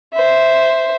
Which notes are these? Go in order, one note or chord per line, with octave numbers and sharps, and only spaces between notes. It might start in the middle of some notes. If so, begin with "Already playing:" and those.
C5 E5